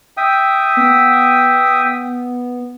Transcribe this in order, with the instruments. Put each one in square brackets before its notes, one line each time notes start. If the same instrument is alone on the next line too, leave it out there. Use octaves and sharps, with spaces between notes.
[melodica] E5 G5 D#6
[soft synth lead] B3